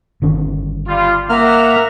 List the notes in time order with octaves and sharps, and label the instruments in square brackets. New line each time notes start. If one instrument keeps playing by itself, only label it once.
[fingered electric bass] G1 D#3 C#4
[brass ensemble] G3 F4
[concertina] A#3 F6 [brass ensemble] E5 F#5 A#5